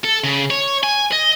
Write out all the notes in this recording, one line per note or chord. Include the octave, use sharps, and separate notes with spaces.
A4
C#3
C#5
G#5
D#5